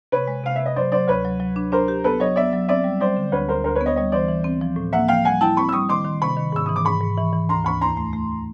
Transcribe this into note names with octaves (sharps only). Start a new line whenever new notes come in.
C3 B4 C#5
G#3
C3 F5
C3 E5
D#5
F#3 C5 D5
F#3 C5 D5
D2 B4 C#5
F#3
F#3
D4
D4 A#4 C5
G4
B3 A4 B4
F#3 C#5 D#5
B3 D5 E5
F#3
C4 D5 E5
G3
G3 C5 D5
D3
D2 B4 C#5
D2 A#4 C5
D2 A#4 C5
B4 C#5
B3
C#5 D#5
G3 C#5 D#5
E3 C5 D5
E3
C4
F3
A2
A#3 E5 F#5
F3 F5 G5
G3 F#5 G#5
E4 G5 A5
C4 B5 C#6
E6
G3 C#6 D#6
D#3 C6 D6
D#3
C3 B5 C#6
D#3
G#2 E6
E3 D#6
D6
G#2 B5 C#6
G#2
E3
E3
D2 A#5 C6
D2 B5 C#6
E2 A#5 C6
A3
A3